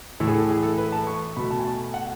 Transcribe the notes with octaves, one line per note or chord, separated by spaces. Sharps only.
A2 E3 A3 A4
G#4
A4
G#4
A4
B4
A5
C#6
B2 A3 B5
A5
G#5
A5
F#5